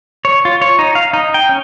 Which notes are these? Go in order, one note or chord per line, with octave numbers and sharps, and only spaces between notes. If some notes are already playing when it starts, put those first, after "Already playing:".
C#5
F4
C#5
D#4
F5
D#4
G5
C#4